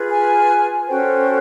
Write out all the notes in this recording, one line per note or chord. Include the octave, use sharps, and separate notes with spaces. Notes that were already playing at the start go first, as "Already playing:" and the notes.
Already playing: F4 G#4 B4
G#5
C#4 F#4 A4 C5 G5